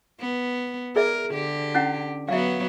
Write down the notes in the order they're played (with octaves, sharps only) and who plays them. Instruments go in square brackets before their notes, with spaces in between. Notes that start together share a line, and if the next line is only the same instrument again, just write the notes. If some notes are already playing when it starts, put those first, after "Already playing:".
[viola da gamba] B3
[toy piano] G#4 D5 E5 [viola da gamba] A#4
[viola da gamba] D3 G4
[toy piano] C#4 E4 F#5
[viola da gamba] F#3 B3 [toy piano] E5 F5